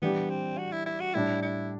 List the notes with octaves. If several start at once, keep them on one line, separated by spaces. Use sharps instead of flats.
E3 G3 B3 D4 G4
C4
F#4
E4
E4
F#4
A2 G3 D4 E4
E4